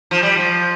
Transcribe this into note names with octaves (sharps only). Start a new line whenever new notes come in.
F3
G3
F3